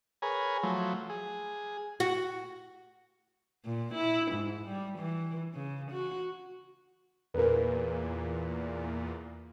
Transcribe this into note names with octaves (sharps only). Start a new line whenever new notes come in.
G#4 A#4 B4 C#5 G#5
F3 F#3 A3
G#4
F#4
A#2
E4
G#2
G3
E3
C#3
F#4
E2 A#2 A#4 B4